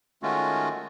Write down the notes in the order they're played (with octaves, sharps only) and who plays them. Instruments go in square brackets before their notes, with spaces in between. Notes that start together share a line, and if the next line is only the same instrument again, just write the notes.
[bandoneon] D#3 G#3 A3 C#4 F4 F#4